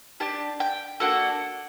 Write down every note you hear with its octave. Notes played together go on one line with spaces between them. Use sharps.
D4 G4 A5
G5
A#3 D4 F#4 A4 F#5